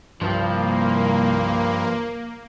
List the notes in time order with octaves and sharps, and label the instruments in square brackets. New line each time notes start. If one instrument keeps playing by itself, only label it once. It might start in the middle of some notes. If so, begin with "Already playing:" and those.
[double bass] C2 [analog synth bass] G2 [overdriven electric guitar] F3 [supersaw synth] A#3